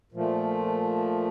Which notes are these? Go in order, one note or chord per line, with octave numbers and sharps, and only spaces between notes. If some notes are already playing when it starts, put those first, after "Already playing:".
A#2 F3 A3